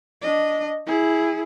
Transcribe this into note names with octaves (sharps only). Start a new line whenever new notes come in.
D4 D#5
E4 G#4